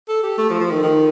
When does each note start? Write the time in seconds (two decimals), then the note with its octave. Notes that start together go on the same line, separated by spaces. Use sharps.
0.09 A4
0.23 G4
0.38 A3
0.50 F3
0.60 F3
0.71 D#3
0.83 D#3